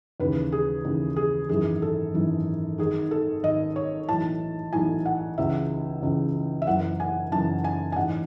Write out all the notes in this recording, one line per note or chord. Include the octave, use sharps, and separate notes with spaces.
D#2 C#3 E3 B4
G#4
D#2 C#3 E3
G#4
G#1 F#2 E3 G#4
A4
G#1 F#2 E3
G#1 G#2 D#3 G#4
A4
G#1 G#2 D#3 D#5
C#5
B1 A2 E3 A5
B1 A2 E3 G#5
F#5
C#2 C#3 E3 E5
C#2 C#3 E3
E5
F#1 F#2 E3 F#5
G#5
F#1 F#2 E3 A5
G#5
G#5
A1 G#2 E3 F#5